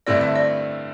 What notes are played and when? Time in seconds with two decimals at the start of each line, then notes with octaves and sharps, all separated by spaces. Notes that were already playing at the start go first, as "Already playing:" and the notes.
0.07 G2 D3 A3 C4 E4 D5
0.21 E5
0.36 D5